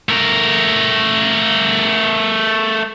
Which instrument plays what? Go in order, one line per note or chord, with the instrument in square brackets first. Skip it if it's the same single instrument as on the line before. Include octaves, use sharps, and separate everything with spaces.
[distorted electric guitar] A3 A#4